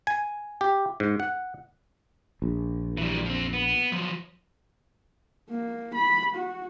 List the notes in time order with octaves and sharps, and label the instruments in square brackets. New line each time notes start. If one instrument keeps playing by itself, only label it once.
[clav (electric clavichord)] G#5
G4
G#2
F#5
[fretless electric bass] A#1
[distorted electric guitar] E3 G3
F3 C4
B3
F3 F#3
[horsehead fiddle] A#3
B5
F#4